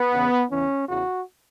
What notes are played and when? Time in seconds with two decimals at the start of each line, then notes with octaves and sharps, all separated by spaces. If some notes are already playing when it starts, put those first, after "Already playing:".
Already playing: B3
0.12 E2 C#3 E3
0.50 E2 C#3 E3 C#4
0.88 E2 C#3 E3 F#4